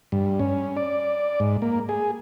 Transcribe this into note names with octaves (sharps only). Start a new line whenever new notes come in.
G2
C#4
D5
G#2
A#3
G#4